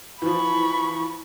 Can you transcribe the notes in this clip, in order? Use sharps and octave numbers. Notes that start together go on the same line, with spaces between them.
E3 F3 B5 C#6